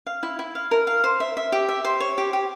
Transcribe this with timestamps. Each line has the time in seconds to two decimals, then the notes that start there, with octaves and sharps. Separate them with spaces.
0.06 F5
0.23 E4
0.39 E4
0.55 F5
0.71 A#4
0.87 F5
1.04 C5
1.20 E5
1.37 E5
1.52 G4
1.69 E5
1.85 C5
2.00 C#5
2.18 G4
2.33 G4